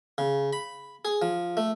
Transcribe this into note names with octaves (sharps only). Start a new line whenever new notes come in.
C#3
B5
G#4
F3
A3